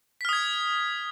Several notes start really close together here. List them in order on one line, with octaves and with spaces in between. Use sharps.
B6 F6 D#6 G#6